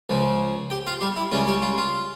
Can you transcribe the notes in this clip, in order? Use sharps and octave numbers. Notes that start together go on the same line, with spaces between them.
C#2 C#3 F3
G4 G5
F4 F5
G3 G4
E4
C#2 C#3 G3 C#4 F4
G3 G4
F4
F4